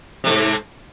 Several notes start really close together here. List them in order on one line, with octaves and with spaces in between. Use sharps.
C3 A3 G#2